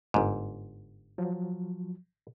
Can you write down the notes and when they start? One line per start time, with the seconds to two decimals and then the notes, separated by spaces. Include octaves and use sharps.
0.14 G1 G#2
1.18 F3 F#3